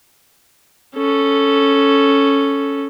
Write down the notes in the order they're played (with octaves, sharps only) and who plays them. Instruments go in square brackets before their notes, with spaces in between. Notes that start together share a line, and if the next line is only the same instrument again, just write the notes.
[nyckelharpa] C#4 A4